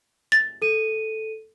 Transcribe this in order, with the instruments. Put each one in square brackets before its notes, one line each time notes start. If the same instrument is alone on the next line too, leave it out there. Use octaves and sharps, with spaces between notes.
[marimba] A6
[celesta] A4 D#7